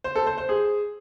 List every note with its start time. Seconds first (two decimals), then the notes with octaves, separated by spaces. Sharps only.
0.04 C5
0.16 A4
0.27 C5
0.38 C5
0.49 G#4